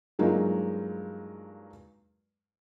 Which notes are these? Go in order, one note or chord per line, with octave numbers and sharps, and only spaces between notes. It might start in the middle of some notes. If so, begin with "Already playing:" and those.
G2 F#3 G#3 A#3 D#4 F4